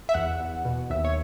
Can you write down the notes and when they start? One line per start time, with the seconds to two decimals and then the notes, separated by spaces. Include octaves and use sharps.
0.09 E5
0.14 E2 F#5
0.40 E2
0.65 B2
0.90 D#2 E5
1.05 C#5